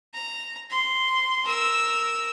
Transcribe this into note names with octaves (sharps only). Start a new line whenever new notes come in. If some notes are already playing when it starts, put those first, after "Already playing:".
A#5
C6
A#4 E6